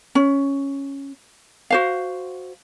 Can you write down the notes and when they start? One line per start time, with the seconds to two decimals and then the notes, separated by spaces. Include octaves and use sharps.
0.15 C#4
1.70 F#4 C5 F5